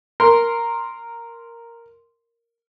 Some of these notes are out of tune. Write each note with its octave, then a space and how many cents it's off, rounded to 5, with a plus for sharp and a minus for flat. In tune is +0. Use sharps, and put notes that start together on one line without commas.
A#4 +0 C6 +0